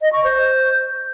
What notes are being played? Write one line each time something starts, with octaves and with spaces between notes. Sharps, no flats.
D#5
C#6
C5